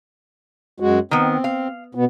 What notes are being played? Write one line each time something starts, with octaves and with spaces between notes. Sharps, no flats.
F#2 G#3 F#4
D#3 B3 C4
F5
B2 B3